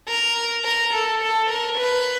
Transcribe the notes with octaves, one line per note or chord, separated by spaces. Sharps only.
A#4
A#4
A4
A4
A#4
B4